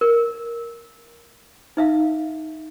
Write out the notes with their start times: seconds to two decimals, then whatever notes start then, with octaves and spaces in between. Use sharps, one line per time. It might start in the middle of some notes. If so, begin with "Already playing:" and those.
0.01 A#4
1.77 D#4 E5 F5